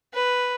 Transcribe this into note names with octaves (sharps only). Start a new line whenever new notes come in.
B4